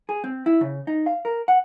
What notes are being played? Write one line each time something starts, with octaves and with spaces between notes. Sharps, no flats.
G#4
C4
E4
C#3
D#4
F5
A#4
F#5